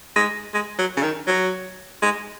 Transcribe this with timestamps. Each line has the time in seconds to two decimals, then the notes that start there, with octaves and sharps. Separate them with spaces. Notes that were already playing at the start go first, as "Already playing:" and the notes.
0.16 G#3
0.53 G#3
0.79 F#3
0.97 C#3
1.03 D#3
1.27 F#3
2.02 G#3